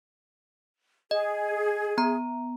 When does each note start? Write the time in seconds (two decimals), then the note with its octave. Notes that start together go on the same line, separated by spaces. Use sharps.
1.11 G#4 D#5
1.98 B3 A#5